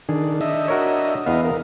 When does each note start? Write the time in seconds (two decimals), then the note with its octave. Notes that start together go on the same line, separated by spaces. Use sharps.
0.09 D#3 D4 G#4
0.41 D4 D#5 E5
0.68 F#4 A#4 C#5
1.26 E2 B3 D#5 F5
1.45 A#4